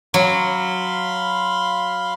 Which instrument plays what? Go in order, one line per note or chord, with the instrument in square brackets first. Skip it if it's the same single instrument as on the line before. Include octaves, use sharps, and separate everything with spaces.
[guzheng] F#3 [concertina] F5 B5 C6